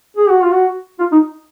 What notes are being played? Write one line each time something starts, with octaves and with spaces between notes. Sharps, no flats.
G#4
F#4
F4
F#4
F4
D#4